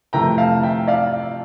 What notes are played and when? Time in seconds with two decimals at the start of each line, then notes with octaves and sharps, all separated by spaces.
0.13 F2 C3 E3 A3 C4 G5 A#5
0.38 F5 A5
0.63 E5 G5
0.87 D5 F5